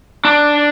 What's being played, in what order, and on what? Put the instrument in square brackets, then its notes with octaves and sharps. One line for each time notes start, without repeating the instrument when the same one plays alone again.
[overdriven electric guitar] D4